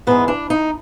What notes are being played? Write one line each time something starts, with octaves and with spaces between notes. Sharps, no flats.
G#2 E3 G#3 B3
D4
D#4